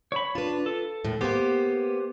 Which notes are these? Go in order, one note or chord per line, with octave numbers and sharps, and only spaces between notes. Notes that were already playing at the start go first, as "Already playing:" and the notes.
C#5 B5
D4 F4 B4
A4
D#2 A2
A#3 B3 G4 C5